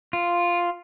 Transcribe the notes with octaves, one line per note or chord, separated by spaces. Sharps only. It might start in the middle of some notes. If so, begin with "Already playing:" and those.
F4